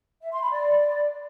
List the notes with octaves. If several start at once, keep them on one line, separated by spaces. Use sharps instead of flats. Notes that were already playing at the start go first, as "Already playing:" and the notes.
E5
C6
B5
D5